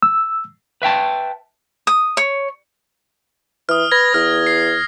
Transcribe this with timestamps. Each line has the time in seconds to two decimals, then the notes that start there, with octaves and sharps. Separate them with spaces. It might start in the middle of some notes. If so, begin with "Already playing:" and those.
0.02 E6
0.82 B4 E5 G5 A5
1.87 D#6
2.17 C#5
3.69 E3 D#6 F6
3.91 B4 G#6 A#6
4.14 E2 F6
4.47 C7